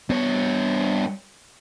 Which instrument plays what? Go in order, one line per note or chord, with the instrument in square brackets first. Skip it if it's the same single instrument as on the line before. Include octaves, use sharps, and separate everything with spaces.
[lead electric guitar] G2 C#5 [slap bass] B3